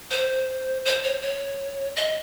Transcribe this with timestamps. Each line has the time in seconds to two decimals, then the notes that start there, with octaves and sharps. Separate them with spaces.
0.11 C5
0.85 C5
1.04 C#5
1.22 C#5
1.96 D#5